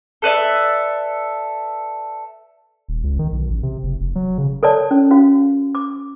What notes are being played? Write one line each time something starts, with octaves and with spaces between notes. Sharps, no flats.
A4 B4 D5 E5
D#1
C#2
D#3
B1
A1
C3
F#1
F1
F#3
C#3
A4 A#4 C#5 D5 A5
C#4
C#4 F#4 F5
D6